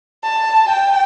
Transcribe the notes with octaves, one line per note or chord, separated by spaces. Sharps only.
A5
G5